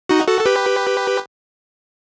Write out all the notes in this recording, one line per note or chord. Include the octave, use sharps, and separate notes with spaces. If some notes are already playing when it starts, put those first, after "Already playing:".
D#4 F#4
F#4 A4
A4
G4 B4